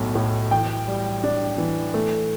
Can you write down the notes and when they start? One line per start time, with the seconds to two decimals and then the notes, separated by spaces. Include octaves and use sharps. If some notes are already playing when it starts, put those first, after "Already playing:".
Already playing: B1 A2
0.15 A2
0.51 E3 G5
0.87 G3
1.24 D4
1.58 E3
1.94 A3